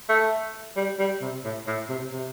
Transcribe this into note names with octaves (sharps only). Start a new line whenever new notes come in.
A3
G3
G3
C3
A2
A2
C3
C3